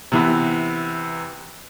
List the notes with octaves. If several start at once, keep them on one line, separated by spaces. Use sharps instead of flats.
C3 E3 B3